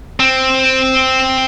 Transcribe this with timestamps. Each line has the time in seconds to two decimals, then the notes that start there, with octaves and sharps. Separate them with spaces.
0.20 C4